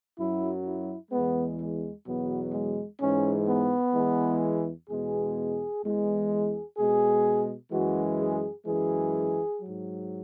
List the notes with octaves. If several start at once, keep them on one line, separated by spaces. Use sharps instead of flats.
F#2 F#3 E4
E4
E2 E3 G#3 B3
G#3
E2 B2 F#3 B3
G#3
G#2 E3 G#3 C#4
B3
E2 E3 G#3
E2 B2 G#3 G#4
E2 E3 G#3
G#4
B2 G#3 G#4
F#2 E3 G#3 F#4
G#4
F#2 E3 G#3 G#4
G#2 F#3